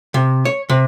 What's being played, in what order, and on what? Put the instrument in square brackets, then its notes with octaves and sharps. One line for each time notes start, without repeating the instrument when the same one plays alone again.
[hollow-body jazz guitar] C3
C#5
C3